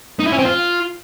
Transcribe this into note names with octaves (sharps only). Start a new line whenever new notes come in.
D#4
E4
C#4
C4
F4